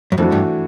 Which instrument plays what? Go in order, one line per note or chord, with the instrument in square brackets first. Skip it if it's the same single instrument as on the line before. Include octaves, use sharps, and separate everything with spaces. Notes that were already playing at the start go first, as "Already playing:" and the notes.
[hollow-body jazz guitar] F#2
[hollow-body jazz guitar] F2 [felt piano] E3 A3 D4 F#4
[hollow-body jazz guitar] G2